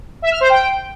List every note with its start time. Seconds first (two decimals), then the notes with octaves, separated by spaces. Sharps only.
0.22 E5
0.31 F6
0.41 C5
0.50 G5